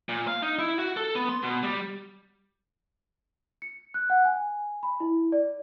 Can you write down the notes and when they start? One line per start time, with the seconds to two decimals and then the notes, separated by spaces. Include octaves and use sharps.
0.09 A#2
0.28 F5
0.42 D#4
0.59 E4
0.79 F#4
0.97 A4
1.15 B3
1.29 C6
1.42 B2
1.63 G3
3.62 C#7
3.94 F#6
4.10 F#5
4.25 G#5
4.83 B5
5.00 E4
5.32 D5